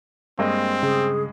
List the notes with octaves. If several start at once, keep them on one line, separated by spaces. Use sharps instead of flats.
G2 G#3 A#3 C4 D#5
C#3 G#4